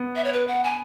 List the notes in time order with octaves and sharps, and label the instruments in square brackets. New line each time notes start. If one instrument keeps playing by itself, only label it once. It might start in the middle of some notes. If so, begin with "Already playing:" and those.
Already playing: [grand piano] B3
[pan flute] E5
C#5
B4
F#5
G#5